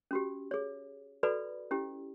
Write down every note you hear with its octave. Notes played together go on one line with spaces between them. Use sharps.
C#4 F#4 G4
G#4 C#5
F#4 A4 B4 D5 B5
C#4 E4 G4